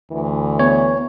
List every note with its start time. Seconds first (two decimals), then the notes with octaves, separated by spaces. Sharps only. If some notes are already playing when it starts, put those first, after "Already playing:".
0.12 D2 E3
0.59 B3 C#5